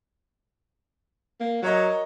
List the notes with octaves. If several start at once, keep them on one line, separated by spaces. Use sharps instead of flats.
A#3
F#3 A#4 C#5 D#5